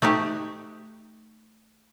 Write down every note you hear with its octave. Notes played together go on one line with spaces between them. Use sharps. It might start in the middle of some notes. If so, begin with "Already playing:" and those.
A3 D#4 F#4 G4